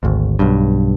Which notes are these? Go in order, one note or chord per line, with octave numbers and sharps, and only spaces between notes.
G#1 D2
B1 G2